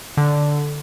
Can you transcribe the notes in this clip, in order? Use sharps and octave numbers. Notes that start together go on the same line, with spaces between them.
D3